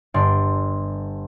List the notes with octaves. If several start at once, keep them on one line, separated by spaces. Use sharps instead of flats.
G1 G2 D5 C6